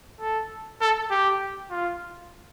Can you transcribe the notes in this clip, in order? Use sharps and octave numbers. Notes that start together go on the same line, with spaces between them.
A4
A4
G4
F4